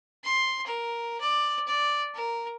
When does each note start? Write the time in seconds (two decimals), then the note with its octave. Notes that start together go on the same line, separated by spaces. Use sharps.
0.24 C6
0.66 A#4
1.21 D5
1.67 D5
2.14 A#4